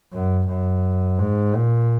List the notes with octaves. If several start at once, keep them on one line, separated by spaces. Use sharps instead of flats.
F#2
F#2
G#2
A#2